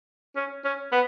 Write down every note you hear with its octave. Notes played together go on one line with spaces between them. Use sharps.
C#4
C#4
B3